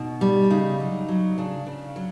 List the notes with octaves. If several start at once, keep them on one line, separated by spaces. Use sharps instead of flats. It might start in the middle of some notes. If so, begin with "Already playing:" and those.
Already playing: B2 D#4
G3
C#3 D#4
F#3
F#3
C#3 D4
C#3
F#3